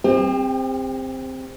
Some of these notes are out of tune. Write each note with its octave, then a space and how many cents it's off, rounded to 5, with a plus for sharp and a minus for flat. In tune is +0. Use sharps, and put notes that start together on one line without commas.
C4 +0 G4 +45